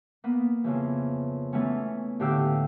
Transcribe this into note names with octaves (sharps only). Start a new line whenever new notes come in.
A#3 B3
F2 C#3 E3
E3 A3 B3 C#4
A2 D3 G4 F5 G5 E6